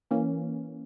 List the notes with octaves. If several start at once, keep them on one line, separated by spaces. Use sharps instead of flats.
E3 A#3 C#4